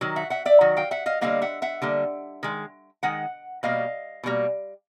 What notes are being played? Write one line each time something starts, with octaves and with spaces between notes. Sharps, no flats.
D#3 F#3
E5 F#5
E5 F#5
D5 E5
D#3 F#3
F5 G5
E5 F#5
D#5 F5
D3 G3 A#3 D#5 F5
E5 F#5
E5 F#5
D3 G3 A#3
D#3 G#3
D#3 G#3 F#5
B2 G3 A#3 D#5 F5
B2 G3 A#3